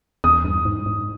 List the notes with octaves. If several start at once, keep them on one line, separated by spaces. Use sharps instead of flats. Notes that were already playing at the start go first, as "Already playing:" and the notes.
E2 D#6
G2
G#2
G#2